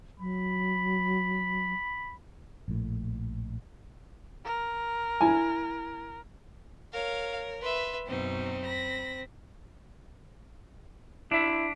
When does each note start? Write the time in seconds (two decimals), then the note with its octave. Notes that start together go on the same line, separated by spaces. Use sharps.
0.20 F#3 B5
2.68 A#1 A2
4.45 A#4
5.21 E4 G#5
6.93 A#4 C#5 F5
7.62 B4 E5 C6
8.07 F#2 B2 C4 D#4
8.65 B5 A#6
11.31 D4 E4 E5